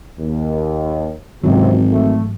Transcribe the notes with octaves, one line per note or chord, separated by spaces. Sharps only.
D#2
G#1 C#2 G#2 C3 E3 F#3
A3